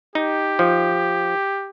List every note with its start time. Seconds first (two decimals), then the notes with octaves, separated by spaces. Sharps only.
0.15 D#4 G4
0.59 F3